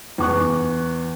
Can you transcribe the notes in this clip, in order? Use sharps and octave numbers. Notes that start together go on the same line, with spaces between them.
E2 C#6 F#6